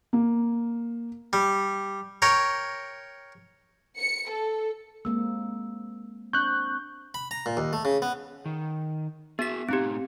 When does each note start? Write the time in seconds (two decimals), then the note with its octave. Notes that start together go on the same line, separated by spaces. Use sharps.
0.13 A#3
1.33 G3
2.22 A#4 C#5 G5 A#5
3.97 C#7
4.30 A4
5.05 G#3 A#3 C4 E6
6.33 C4 D4 C#6 F#6 G6
7.14 B5
7.31 A#5
7.46 A#2
7.57 D#2
7.73 A3
7.85 C#3
8.02 B3
8.46 D#3
9.39 B3 F#4 G#4 B6
9.69 A2 C4 D#4 G4